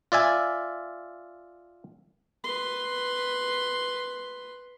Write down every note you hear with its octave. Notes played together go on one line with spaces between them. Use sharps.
F4 D5 E5 G#5
B4 C6